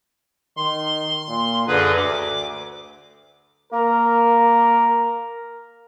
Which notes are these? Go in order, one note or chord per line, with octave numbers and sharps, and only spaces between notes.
D#3 C6
A#2
F#2 D3 G#4 B4
D2 D6
A#3 A#4